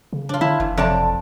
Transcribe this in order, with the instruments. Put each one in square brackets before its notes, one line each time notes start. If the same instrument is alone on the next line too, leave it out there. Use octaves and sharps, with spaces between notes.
[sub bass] C#3
[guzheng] D4 F4
[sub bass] D3 [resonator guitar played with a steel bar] E4
[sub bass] F#1 [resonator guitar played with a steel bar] E3
[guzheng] F2 [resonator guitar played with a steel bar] C3 D5 A5